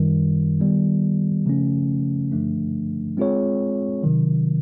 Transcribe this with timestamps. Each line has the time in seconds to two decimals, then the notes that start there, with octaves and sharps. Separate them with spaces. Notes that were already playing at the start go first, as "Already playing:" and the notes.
Already playing: F#2 D#3 G3
0.60 D#3 G3 B3
1.46 C#3 F3 A3 C#4
2.32 G2 D3 F3 A3 D4
3.17 G#3 C4 F4 G#4 C#5
4.03 C3 D#3 F#3